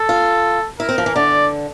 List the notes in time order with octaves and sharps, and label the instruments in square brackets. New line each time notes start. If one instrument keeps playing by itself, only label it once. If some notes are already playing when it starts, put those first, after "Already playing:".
Already playing: [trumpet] A4
[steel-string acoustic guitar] F4
[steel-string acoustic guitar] E4 [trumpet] A#4
[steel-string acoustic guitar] C4
F3
E3
[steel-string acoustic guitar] D3 [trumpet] D5